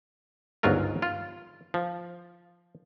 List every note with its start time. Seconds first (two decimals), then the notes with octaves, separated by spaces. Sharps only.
0.63 G1 C#2 G#2 F#3 F4 A#4
1.02 F4
1.74 F3